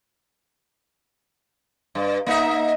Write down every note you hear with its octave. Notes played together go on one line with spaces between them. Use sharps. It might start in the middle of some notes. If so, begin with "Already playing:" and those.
G2
A#3 D#4 E5